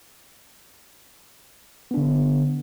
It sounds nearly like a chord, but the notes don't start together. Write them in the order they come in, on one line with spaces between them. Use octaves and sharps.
B3 D4 D3